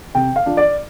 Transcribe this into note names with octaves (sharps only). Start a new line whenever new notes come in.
C3 G5
F5
F3 D4
D5